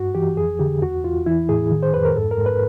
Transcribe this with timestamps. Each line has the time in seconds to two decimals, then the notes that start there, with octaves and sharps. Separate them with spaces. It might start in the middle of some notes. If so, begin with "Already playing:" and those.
Already playing: G2 F#4
0.15 E3 G4
0.37 F2 G#4
0.59 D3 G4
0.82 E2 F#4
1.04 E2 F4
1.26 E3 E4
1.49 A2 G#4
1.71 D#3
1.83 C5
1.94 F2 B4
2.05 A#4
2.16 G#2 A4
2.31 A#4
2.38 G#2
2.46 B4